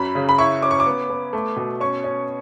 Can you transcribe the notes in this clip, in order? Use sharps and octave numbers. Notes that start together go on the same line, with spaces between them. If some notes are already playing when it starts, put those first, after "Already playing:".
Already playing: F#2 F#3 B5
C#3
B5
E4 C#6
C#4 D6
C#6
D6
B3
B3
A3
B2
C#4 C#6
C#4